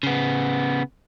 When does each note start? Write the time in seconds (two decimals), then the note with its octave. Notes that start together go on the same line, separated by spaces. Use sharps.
0.03 C#3 B3